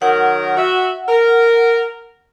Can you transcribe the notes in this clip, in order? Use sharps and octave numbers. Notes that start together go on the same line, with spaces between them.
D#3 F#3 A#4 F#5
F#4 E5
A#4